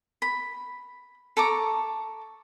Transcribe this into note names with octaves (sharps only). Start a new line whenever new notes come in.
B5
A4 A#5 C#6 D6